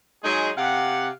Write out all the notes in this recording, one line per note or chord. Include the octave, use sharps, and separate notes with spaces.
F#3 G#3 D#4 G#4
C3 G4 F5 F#5